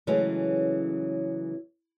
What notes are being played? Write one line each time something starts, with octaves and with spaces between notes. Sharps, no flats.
C#3 E3 F#3 G#3 A3 C#4